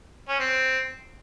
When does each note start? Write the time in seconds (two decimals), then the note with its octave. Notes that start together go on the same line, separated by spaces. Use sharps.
0.28 C#4
0.39 C4